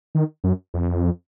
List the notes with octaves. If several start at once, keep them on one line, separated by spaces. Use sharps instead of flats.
D#3
F#2
F2